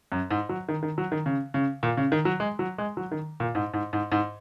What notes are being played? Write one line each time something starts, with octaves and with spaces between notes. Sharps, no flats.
F#2
G#2
F#3
D#3
D#3
F#3
D#3
C#3
C#3
A#2
C#3
D#3
F#3
G#3
F#3
G#3
F#3
D#3
A#2
G#2
G#2
G#2
G#2